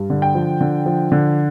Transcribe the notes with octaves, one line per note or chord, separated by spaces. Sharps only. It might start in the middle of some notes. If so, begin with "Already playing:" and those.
Already playing: G2
D3
G5
F3
D3
F3
D3